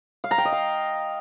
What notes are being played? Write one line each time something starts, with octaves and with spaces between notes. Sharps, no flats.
F5
A#5
G5
D#5
F5